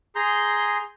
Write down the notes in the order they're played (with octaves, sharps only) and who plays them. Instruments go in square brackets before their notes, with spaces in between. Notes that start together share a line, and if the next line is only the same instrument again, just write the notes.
[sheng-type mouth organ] G#4 A#5 C6 G6